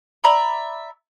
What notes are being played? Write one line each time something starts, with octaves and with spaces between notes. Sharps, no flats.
D5 E5 A#5 B5